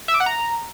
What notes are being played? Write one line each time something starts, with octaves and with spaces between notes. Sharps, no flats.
E5
D6
F#5
A#5